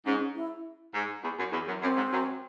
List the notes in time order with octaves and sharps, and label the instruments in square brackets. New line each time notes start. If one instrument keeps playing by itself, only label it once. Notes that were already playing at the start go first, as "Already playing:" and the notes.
[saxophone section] G#2 [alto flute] C#4
[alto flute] E4
[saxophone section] G#2
E2
F#2
E2
F#2
[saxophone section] F#2 [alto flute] C4
[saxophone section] G#2
F#2